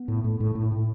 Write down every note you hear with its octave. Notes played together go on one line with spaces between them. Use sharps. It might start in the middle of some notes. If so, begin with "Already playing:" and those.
Already playing: B3
A2
A2
A2
A2
A2